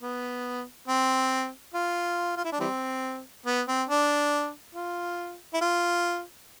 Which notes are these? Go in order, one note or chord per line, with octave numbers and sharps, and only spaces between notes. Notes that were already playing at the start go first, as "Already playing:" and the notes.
B3
C4
F4
F4
E4
D4
E3 G3 C4
B3
C4
D4
F4
E4
F4